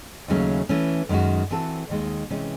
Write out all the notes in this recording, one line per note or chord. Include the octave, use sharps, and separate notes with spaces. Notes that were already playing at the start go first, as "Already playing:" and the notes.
D#2 C#3 F#3 A3 C#4
E3 A3 C#4
F#2 D#3 G#3 C#4 F#4
E3 C4 F#4 A4
D#2 D#3 G#3
C3 E3 G#3 C#4